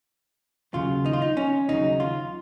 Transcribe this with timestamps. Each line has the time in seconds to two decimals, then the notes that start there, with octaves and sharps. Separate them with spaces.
0.73 D#2 C#3 F#3 F4
1.06 D#4
1.13 F4
1.22 D#4
1.37 C#4
1.68 D#2 C#3 F#3 D#4
2.00 F4